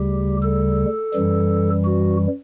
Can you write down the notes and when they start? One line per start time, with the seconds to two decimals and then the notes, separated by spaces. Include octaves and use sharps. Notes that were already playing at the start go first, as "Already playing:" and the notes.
Already playing: D2 C#3 G3 G4
0.42 A4
1.14 F#2 E3 G3
1.85 F#4